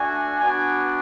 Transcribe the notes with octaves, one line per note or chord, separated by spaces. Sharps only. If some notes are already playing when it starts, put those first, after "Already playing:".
Already playing: A3 D4 F#4 G#5
B3 D4 F#4 G#5